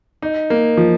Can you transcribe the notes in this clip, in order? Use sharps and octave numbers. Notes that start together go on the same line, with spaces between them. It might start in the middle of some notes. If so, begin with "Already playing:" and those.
D#4
A#3
F3